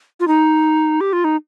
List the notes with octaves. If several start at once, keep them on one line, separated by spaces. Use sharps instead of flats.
F4
D#4
G4
F4
D#4